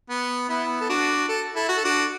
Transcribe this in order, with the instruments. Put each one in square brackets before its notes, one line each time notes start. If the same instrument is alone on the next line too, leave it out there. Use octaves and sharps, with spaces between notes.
[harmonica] B3
B3 E4
A4
D4 F#4
A4
E4 A4
F#4
A4
D4 F#4